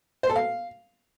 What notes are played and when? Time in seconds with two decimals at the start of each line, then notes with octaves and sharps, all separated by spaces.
0.23 C5
0.29 A4
0.36 F5